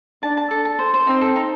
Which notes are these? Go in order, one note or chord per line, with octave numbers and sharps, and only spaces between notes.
D4 A5
A5
A4
A5
C5
C5
C4 D#4
A4
D#4